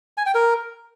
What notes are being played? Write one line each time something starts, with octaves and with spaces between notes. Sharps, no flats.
G#5
G5
A#4